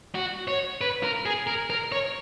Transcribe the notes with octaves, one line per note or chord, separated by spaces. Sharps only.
F#4
C#5
B4
A#4
G#4
A#4
A#4
C#5